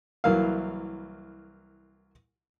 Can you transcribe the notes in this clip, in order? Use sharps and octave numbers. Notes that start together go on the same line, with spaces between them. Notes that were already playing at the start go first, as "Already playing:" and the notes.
C2 E3 F#3 A#3 F5